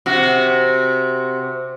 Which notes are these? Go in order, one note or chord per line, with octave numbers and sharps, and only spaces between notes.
C3 F#4